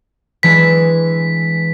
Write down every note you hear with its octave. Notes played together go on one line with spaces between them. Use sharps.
E3 G#3 D4 B6